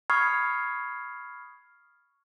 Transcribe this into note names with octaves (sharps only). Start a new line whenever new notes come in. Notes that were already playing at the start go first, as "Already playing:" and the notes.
B5 C#6 D#6 F6 G#6 C7